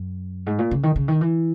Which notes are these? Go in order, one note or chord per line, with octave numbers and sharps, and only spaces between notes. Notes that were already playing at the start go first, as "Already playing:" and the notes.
Already playing: F#2
G#2
A#2
C#3
D#3
C#3
D#3
E3